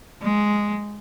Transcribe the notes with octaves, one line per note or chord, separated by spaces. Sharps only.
G#3